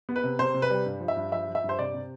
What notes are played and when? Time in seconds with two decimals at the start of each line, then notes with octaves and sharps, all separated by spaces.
0.09 B3
0.16 B4
0.24 C3
0.39 C3 C5
0.54 C3
0.62 B4
0.70 G3
0.86 G2
1.01 F3
1.08 E5
1.17 G2
1.32 F3 E5
1.48 F3
1.55 E5
1.64 G2
1.69 C5
1.78 C3 D5
1.94 C3